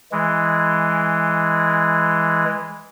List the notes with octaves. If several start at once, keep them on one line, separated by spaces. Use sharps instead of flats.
E3 G#3